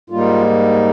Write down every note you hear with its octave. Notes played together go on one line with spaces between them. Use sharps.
G#2 G3 A#3 D#4 F4